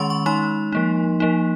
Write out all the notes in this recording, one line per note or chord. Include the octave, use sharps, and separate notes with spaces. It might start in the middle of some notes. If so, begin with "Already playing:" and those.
Already playing: D#3 G#3 C#4 C6 C#6
C#6
G#3 D#4 C6
F3 A#3 D#4
F3 A#3 D#4